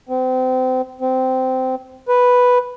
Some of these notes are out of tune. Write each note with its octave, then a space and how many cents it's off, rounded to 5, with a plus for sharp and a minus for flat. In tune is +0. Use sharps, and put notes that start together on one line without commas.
C4 -30
C4 -15
B4 +0